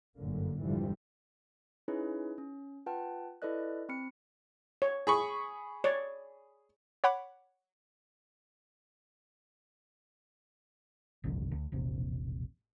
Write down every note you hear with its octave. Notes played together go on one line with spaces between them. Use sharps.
G1 F#2 A2 D3 A#3
F1 G#2 D3 E3 F3 G3
C#4 D#4 E4 G#4 B4 C#5
C#4
F4 B4 F#5 G5 A5 F6
E4 A4 B4 D5 D#5 F#6
C4 B5 F6 C#7
C#5
G#4 B5 C#6
C#5 D5
C#5 F#5 B5 D6
G1 C2 F2 D3
D2
E1 A#1 C3